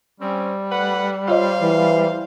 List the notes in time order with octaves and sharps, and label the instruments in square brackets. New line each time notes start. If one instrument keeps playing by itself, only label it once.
[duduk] G3 [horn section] C4 C#4
[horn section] A3 B4 F#5
[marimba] F4 C#5 D#5 [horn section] C5 F5
[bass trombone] E3